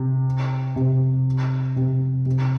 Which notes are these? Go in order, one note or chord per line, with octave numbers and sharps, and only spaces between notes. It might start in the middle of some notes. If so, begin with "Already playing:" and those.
Already playing: C3
C3
C3
C3